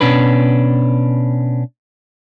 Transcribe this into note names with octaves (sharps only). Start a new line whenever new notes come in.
B2 C#4 D4 B4